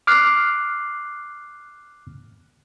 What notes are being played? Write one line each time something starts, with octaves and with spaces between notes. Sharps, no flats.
D6 F6 F#6 C7